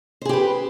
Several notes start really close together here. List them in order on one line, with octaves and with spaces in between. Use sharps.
C5 G#4 G4 B4